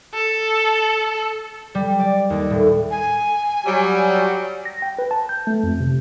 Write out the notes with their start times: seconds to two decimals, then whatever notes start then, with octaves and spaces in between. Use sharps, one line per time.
0.14 A4
1.75 G3
2.00 D5
2.30 D#2
2.50 A2
2.91 G#5
3.65 F#3 G3
4.65 A#6
4.82 G5
4.99 B4
5.11 A5
5.29 G6
5.47 A3
5.63 F2
5.80 C3